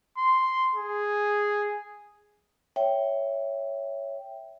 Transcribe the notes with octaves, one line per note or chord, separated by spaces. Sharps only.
C6
G#4
C#5 E5 G5